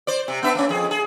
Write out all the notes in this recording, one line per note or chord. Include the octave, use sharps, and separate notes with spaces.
C5 D5
C3
B3 D4 E5
A#3 C#4
F2 G#4
G#4